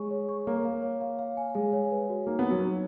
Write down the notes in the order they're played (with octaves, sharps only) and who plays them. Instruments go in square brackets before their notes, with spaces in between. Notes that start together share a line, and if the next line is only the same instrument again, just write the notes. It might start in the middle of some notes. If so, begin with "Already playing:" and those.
Already playing: [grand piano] G#3 [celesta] G#4 C#5 G#5 C#6
[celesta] C#5
C#6
[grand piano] A#3 [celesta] C#5
[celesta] F5
C#5
F5
F5
G#5
[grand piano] G#3 [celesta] G#5
[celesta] C#5
B4
F#4
[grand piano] A#3 [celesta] D#4
[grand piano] B3
[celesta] D#4
[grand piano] F#3
[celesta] D#4